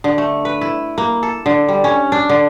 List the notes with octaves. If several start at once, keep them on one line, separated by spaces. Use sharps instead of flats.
D3
A3
B4
E4
A#3
A4
D3
G3
C#4
D4
D3